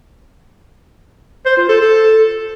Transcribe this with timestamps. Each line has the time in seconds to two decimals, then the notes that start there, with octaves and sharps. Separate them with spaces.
1.46 C5
1.57 F4
1.69 A4
1.81 A4